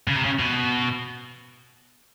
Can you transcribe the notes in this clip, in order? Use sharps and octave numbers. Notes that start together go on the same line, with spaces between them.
C#3
C3
C#3
B2